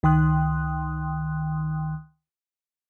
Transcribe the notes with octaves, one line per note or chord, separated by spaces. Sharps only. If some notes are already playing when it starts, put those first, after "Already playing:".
C#2 D#3 G5 C6 D#6 F#6